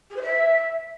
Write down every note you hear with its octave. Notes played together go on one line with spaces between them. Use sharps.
G#4
C5
E5